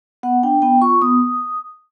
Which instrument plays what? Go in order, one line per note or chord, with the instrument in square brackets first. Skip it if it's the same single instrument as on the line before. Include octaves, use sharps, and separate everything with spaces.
[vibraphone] B3 F#5
D4 G5
B3 G5
F4 C#6
B3 D#6